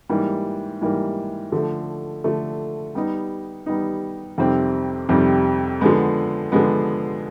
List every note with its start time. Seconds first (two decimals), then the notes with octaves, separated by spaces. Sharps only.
0.09 G#2 E3 G3 A#3
0.81 G#2 E3 G3 A#3
1.52 D3 F3 A3
2.24 D3 F3 A3
2.95 G3 B3 D#4
3.66 G3 B3 D#4
4.38 F2 C3 D#3 G3 C4
5.09 F2 C3 D#3 G3 C4
5.81 D3 F3 G#3 B3
6.52 D3 F3 G#3 B3